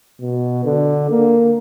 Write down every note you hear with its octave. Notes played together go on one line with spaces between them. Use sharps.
B2
D3
A#3